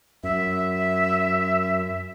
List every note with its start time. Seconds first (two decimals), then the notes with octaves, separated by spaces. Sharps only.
0.24 F#2 E5